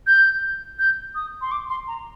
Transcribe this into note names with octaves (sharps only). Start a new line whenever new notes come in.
G6
G6
D#6
C6
D6
C6
A#5